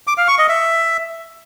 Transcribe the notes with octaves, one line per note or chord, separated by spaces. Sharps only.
D6
F5
C#6
D#5
E5